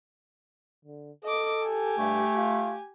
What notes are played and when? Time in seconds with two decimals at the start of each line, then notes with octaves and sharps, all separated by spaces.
0.85 D3
1.24 A4 D#5 D6
1.65 G4 G#5
1.98 G2 A3
2.36 F4